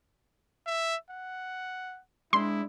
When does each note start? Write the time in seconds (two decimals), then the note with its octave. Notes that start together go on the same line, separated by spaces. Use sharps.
0.67 E5
1.10 F#5
2.33 G#3 D4 E4 C6